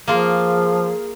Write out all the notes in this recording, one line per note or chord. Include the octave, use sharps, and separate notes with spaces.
F3 A#3 F4 G#4